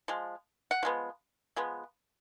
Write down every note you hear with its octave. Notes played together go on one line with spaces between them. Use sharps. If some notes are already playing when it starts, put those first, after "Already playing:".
F3 G#3
F#5
F3 G#3 B3
F3 G#3 B3